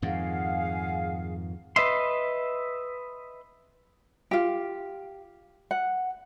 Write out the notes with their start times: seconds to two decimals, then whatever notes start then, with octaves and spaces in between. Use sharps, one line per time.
0.02 F2 G#2 D#3 G#4 F5 F#5
1.76 B4 D#5 E5 C6
4.31 F4 G4
5.71 F#5